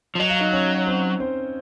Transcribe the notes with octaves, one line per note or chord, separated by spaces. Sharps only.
F3
F#3 D#5
F5
D#4 D#5
C#4 C#5
C4 C5
C4 C5